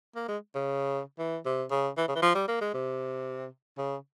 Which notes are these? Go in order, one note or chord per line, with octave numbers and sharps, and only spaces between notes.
A#3
G#3
C#3
E3
C3
C#3
E3
C#3
E3
F3
G3
A#3
G#3
C3
C#3